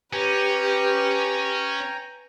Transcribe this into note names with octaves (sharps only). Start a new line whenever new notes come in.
C#4 G4 B4 G5 G#5 A#5